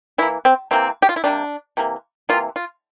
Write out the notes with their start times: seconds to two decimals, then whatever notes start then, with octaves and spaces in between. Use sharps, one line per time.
0.18 E3 E4
0.22 A#3
0.45 C4
0.71 C3 E3 A#3 C4
1.02 G4
1.09 F4
1.16 E4
1.24 C3 G3 A#3 D4
1.77 C3 E3 A#3
2.29 C3 E3 A#3 F4
2.56 F4